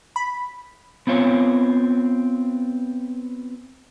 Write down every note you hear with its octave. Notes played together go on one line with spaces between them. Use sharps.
B5
B3 C4 F4 C#5